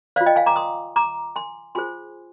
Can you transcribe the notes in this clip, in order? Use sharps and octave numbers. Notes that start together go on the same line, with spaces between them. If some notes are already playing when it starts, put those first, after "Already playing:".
F4 C5 D5 F5
D#5 G5
F5 G#5
A#5 D6
C6 D#6
A#5 D6
G#5 C6
F4 G#4 C5 G#5 C6